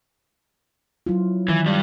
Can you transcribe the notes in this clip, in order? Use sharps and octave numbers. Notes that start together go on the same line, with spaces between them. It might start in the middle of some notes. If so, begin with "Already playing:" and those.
F#3 E4 F4
D#3 E3
G2 G3